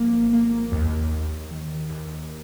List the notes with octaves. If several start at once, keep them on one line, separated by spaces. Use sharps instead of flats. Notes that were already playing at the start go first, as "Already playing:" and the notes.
Already playing: G#1 F3 A#3
A#3
D#2
D#2
D#3
D#2